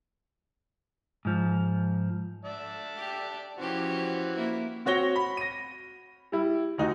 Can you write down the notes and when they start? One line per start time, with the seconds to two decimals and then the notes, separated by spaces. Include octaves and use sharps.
1.25 G#2 F3
2.45 D5 E5 A5
2.97 G4
3.58 E3 F3 C#4 F#4 G4 C5
4.36 A#3 E4
4.86 C4 F#4 C#5 A#6 G7
5.16 B5
5.37 A#6 D#7
6.32 G3 E4
6.78 D2 D#4 F#4